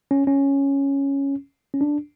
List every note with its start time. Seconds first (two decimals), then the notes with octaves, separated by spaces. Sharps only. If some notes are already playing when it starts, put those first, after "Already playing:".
0.11 C#4
0.27 C#4
1.74 C#4
1.81 D4